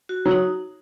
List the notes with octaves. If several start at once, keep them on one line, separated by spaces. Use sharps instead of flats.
F#4
F#3
D#4